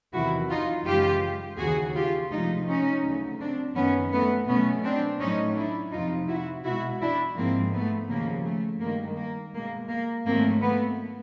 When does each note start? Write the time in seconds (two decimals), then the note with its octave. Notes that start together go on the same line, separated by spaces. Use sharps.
0.14 E2 C3 D#3 F#3 E4 F#4
0.50 D#4 F4
0.86 F#2 C#3 E3 G#3 F4 G4
1.58 D#2 C#3 E3 F#4 G#4
1.95 F4 G4
2.31 D2 C3 F3 G#3 D#4 F4
2.66 C#4 D#4
3.03 D2 C#3 F#3 A3
3.39 C4 D4
3.75 F#2 D#3 G#3 B3 C#4
4.11 A3 B3
4.47 B2 F#3 A3 B3 C#4
4.83 C4 D4
5.19 A2 F#3 A3 C#4 D#4
5.56 D4 E4
5.92 F2 C3 F3 D#4 F4
6.28 E4 F#4
6.64 B2 G#3 E4 F#4
7.00 D4 E4
7.36 G#2 F3 G#3 A#3 C4
7.73 A3 B3
8.08 D#2 C#3 F3 A#3
8.45 A3
8.80 G2 D#3 G#3 A#3
9.18 A#3
9.53 B2 G#3 A#3
9.89 A#3
10.25 G#2 D#3 F#3 A3 A#3 C4
10.61 A3 B3